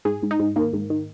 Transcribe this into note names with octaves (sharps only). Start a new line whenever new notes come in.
G#2 G#4
G#2
D#4
G#2
D#3 A#3
G#2
D#3